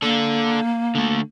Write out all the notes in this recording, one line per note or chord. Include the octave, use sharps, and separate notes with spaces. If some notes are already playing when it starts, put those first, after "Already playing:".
A#3 D4 A4
D3 A3